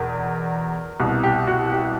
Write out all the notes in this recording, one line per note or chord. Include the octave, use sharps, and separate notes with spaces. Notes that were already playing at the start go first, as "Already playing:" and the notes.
Already playing: E2 B2 A#4
C2 B2
G4
F#4
G4